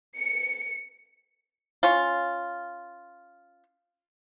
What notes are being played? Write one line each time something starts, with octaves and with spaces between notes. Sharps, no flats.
C#7
C#4 F4